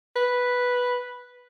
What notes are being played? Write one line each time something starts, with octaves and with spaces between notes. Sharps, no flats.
B4